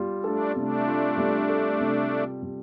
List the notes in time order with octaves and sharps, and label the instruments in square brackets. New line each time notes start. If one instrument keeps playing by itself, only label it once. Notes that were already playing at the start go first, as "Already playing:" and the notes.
Already playing: [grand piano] G3 F4
[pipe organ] A3 D4 [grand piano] A4
[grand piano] C3 [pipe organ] A3 D4
[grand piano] F4
G3
A4
C3
F4
G3